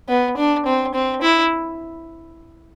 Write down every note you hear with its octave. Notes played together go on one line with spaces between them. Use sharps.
B3
D4
C4
C4
E4